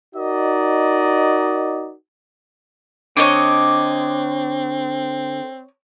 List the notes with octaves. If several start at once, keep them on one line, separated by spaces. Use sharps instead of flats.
D#4 F#4 A#4 D5 D#5
D3 C4 C#5 D#5 D6